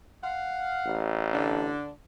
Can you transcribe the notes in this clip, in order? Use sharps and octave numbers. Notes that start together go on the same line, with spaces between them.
F5 F#5
A1
D3 D4